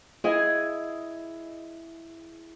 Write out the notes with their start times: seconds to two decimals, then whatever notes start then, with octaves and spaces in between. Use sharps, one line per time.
0.24 E4 G#4 D#5 G#5